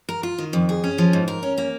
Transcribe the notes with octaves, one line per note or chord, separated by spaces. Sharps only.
A#4
F4
D#3
F2
G#4
C#4
F3
G#2
A#4
C#4
A#3